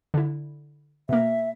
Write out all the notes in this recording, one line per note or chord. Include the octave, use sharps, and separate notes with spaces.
D3 E4
B2 A#3 E5